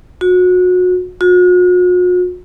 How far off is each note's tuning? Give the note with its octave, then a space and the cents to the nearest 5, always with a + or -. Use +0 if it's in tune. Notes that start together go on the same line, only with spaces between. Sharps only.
F#4 -30
F#4 -45